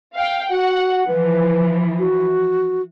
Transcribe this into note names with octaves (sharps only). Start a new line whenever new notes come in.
F5 G5
F#4 F#5
E3 F3 B4
F#4